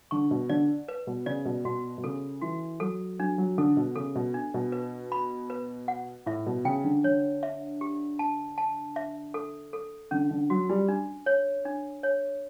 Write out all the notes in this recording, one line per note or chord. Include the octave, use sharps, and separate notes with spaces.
D3 C#6
B2
D3 D5
B4
B2
C#3 D5
B2
B2 F#4
B2
C#3 A4
E3 F#4
F#3 A4
F#3 D4
F#3
D3 A4
B2
C#3 A4
B2
D4
B2
B4
B5
B4
F#5
A2 E5
B2
C#3 G5
D3
D3 C#5
E5
G4
A5
A5
E5
A4
A4
D3 C#4
D3
F#3 F#4
G3
D4
C#5
D4
C#5